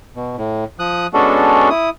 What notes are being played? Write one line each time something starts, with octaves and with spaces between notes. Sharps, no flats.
B2
A2
F3 D#6 F#6
G#3 B3 C#4 D4 F#4 A4
E4 D#6